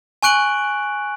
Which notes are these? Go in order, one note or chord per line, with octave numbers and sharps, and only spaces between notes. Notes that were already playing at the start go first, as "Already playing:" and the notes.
G#5 C#6 F#6 D7 F#7